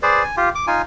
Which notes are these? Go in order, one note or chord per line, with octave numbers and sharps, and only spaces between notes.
G#4 B4 C5 D5
G#5
F4 G4
D6
D#4 F4 G#5